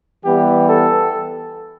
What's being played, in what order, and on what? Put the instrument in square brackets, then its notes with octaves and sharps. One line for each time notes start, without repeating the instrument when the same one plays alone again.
[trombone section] E3 G3 B3 G4
A4